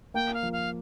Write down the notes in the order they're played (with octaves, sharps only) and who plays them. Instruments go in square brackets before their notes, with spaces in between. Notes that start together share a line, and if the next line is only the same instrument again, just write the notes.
[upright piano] A#3 [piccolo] G5
[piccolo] F5
[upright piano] F3
[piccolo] F5